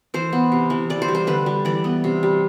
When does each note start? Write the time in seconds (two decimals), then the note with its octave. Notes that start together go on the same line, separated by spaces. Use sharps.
0.14 E3 C5
0.33 B3
0.52 C3
0.70 E3
0.90 E3 D5
1.02 C5
1.08 G3
1.15 C5
1.27 D3 B4
1.46 G3
1.65 E3 D5
1.84 B3
2.04 C3
2.23 G3